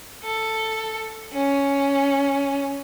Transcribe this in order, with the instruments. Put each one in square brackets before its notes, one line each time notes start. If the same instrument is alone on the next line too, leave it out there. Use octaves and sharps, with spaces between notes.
[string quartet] A4
C#4